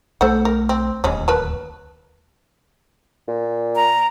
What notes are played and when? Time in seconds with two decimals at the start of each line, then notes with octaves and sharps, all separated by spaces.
0.21 B1 A3 A4 C5 F#5
0.45 A#4
0.69 C4
1.04 D1 D#2 G3 G#3 C#4
1.28 A#4 B4 A5
3.28 A#2
3.76 A#5